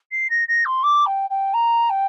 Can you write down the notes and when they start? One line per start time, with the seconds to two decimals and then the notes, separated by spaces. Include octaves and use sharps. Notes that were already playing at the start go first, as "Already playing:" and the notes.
0.11 C7
0.30 A#6
0.48 A#6
0.65 C6
0.83 D6
1.06 G5
1.30 G5
1.54 A#5
1.90 G5